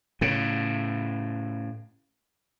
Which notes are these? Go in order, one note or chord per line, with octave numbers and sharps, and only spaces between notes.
A2 C#3